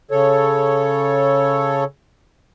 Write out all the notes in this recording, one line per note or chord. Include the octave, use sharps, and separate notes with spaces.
C#3 A4 C#5